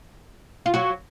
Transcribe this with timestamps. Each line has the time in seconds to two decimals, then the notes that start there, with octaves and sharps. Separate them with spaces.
0.66 F4
0.74 F#3 F#4